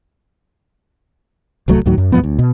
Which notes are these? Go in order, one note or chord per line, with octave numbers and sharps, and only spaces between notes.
D1 C2 F#3 A3
D2 A2 D#3 F#3
F#2
D#2 G#2 F3 B3
D2
B2